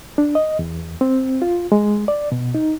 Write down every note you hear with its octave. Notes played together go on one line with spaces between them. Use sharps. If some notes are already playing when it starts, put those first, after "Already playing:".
D4
D#5
E2
C4
F4
G#3
D5
B2
D#4